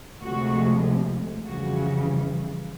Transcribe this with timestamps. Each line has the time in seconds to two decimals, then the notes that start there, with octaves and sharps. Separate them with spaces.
0.22 D2 C3 F3 G#3 F#4
1.46 F2 C#3 E3 G3 F#4